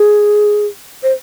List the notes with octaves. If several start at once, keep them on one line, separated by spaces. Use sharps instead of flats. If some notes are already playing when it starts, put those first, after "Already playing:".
Already playing: G#4
C5